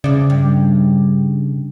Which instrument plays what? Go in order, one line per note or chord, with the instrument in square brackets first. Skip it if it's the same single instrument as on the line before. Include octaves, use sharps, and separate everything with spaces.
[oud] E2 D5 [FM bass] C#3
[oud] G2